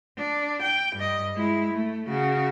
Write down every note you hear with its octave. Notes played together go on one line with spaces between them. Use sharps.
D4
G5
G2 D#5
G#3 E4
A3
C#3 F#4